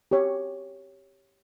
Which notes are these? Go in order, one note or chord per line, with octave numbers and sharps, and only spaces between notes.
G4 C#5